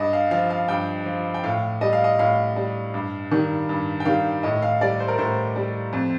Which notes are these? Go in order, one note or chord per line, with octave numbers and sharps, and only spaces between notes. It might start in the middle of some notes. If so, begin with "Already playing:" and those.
Already playing: G2 D#5
F5
F3 F5
F5
G2 G5
F3
G5
A2 F5
G3 D#5
F5
D#5
A2 F5
G3
G2
D#3 G3
G2
G5
D#3 G3 F5
A2 D#5
F5
G3 D5
C5
A#4
A2 C5
G3
F2